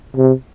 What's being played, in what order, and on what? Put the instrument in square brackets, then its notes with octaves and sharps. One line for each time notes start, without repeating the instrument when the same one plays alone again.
[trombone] C3